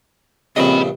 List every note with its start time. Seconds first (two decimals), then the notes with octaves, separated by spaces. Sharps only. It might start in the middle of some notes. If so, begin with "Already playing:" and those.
0.56 A#1 G2 C#3 C4 D#5 B5